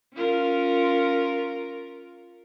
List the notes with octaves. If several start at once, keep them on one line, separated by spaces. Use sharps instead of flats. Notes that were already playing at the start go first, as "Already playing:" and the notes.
C#4 F4 A#4